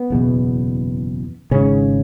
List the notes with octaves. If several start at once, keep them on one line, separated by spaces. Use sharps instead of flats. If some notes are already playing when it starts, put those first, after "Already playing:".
Already playing: B3
F#1 E2 B2
G#1 G#2 C#3 C#4